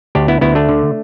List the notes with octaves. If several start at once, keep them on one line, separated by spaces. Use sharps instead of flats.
D2 D4 G4
B3 E4
D2 B3 E4
A3 D4
D3